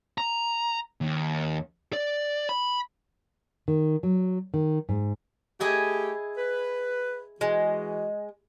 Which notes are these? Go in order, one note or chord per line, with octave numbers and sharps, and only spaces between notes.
A#5
D#2
D5
B5
D#3
F#3
D#3
G#2
A3 E4 G4 G#4 D#5
B4
E3 G#3 F#4